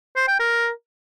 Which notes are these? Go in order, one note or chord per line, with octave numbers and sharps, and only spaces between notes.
C5
G5
A#4